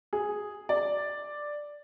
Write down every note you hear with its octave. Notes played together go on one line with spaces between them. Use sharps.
G#4
D5